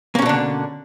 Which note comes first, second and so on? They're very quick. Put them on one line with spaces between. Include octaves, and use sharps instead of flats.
A#3 C#4 B2 D4 D3